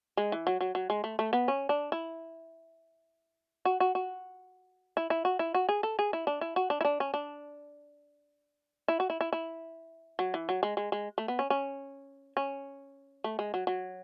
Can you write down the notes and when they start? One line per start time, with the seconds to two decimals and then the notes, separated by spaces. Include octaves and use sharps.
0.17 G#3
0.32 E3
0.47 F#3
0.61 F#3
0.75 F#3
0.90 G#3
1.04 A3
1.19 A3
1.33 B3
1.48 C#4
1.69 D4
1.92 E4
3.65 F#4
3.80 F#4
3.95 F#4
4.97 E4
5.10 E4
5.25 F#4
5.39 E4
5.54 F#4
5.69 G#4
5.83 A4
5.99 G#4
6.13 E4
6.27 D4
6.41 E4
6.56 F#4
6.70 D4
6.81 E4
6.85 D4
7.00 C#4
7.14 D4
8.88 E4
9.00 F#4
9.10 E4
9.21 E4
9.33 E4
10.19 F#3
10.34 E3
10.49 F#3
10.63 G#3
10.77 G#3
10.92 G#3
11.18 A3
11.28 B3
11.39 C#4
11.50 C#4
12.37 C#4
13.24 A3
13.39 G#3
13.54 F#3
13.67 F#3